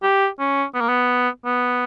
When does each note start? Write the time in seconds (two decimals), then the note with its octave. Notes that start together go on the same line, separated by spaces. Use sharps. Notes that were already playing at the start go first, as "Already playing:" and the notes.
0.03 G4
0.39 C#4
0.74 B3
0.81 A#3
0.89 B3
1.46 B3